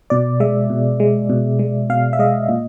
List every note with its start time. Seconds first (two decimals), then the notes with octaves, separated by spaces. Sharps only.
0.10 B2 D5
0.40 G#3 E5
0.70 B2
1.00 G#3
1.30 B2
1.59 G#3
1.90 B2 F5
2.13 E5
2.19 G#3 D#5
2.48 A#2